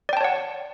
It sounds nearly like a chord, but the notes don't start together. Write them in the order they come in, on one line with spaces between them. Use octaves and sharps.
D5 G5 A5 C#5 F#5